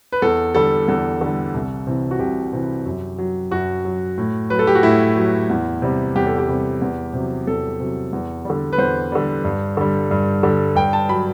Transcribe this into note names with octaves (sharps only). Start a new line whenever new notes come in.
B4
E2 A4
D3 G3 A4
E2 A4
D3 G3
C2
C3 E3
F#4
C2 G4
C3 E3
F#2
F#3
F#2 F#4
F#3
A2
F#3 B4
A4
G4
F#4
A2 E4
F#3
E2
C3 G3
E2 G4
A4
G4
C3 G3
E2
C3 F#3
E2 A4
C3 F#3
E2
D3 G3
B4
E2 C5
D3 G3
G2
D3 G3
G2
D3 G3
G2 G5
A5
F#3 B5